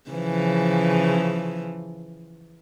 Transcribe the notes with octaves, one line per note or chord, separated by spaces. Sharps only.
C#3 E3 F3